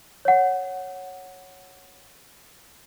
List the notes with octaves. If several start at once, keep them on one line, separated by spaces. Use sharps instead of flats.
C#5 F#5